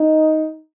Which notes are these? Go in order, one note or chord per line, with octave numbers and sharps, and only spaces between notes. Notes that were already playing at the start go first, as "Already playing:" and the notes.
Already playing: D#4